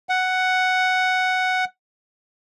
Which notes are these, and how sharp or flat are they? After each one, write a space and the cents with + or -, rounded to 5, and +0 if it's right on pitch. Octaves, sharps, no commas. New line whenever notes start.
F#5 +5